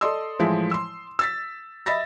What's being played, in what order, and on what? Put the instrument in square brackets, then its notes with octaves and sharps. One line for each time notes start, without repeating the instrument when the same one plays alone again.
[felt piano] A4 D5 D#5 C6 D#6 E6
A2 E3 F3 G#3 E4
C6 E6
E6 A6 B6
D#5 E5 B5 A6 A#6